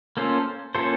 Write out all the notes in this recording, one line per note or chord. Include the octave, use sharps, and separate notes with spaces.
A#3 C#4 F4 A4 C5
A#3 C#4 F4 A4 C5